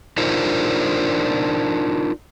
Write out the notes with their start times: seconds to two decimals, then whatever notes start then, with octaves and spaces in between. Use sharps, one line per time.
0.18 D4 D#4 F4 A#4 C5